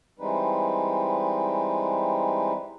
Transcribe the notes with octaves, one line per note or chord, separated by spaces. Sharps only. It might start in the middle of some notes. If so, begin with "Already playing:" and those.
E3 G3 G#3 C4 D#4 B4